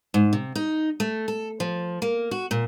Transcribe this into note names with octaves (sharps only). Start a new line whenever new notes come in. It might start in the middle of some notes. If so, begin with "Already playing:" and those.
G#2
C3
D#4
A3
A4
F3
A#3
F#4
A#2